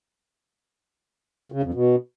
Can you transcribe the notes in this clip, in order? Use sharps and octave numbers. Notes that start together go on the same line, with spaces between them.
C#3
F2
B2